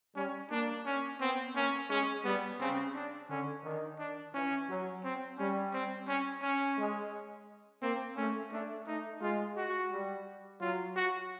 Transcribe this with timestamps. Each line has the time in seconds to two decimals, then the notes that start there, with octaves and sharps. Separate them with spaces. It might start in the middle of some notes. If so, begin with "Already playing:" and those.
0.15 G3 C#4
0.50 A#3 D4
0.85 C#4
1.20 B3 C4
1.54 A#3 C#4
1.90 G#3 C#4
2.24 G3 B3
2.60 C#3 C4
2.94 D4
3.30 D3 C#4
3.64 D#3 D4
3.99 D4
4.34 E3 C#4
4.69 F#3
5.03 C4
5.38 G3 C#4
5.73 C4
6.07 C#4
6.42 C#4
6.77 G#3
7.82 A#3 C4
8.17 A3 C#4
8.52 A3 D4
8.86 A3 D#4
9.21 G#3 F4
9.57 F#4
9.91 G3
10.60 F#3 F4
10.96 F#4